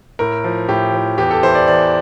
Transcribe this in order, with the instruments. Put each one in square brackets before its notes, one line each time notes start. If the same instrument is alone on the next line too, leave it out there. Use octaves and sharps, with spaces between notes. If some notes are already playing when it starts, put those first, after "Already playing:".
[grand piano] A2 A#4
F3
A2 G4
F3
E2 G4
A4
E3 C5
D5
E2 D5